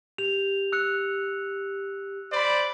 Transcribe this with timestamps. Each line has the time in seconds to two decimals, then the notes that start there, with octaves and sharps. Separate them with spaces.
0.18 G4 F7
0.72 E6 F#6 C#7
2.33 C5 D5 B5